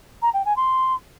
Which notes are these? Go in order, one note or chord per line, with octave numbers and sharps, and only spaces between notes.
A#5
G5
G#5
C6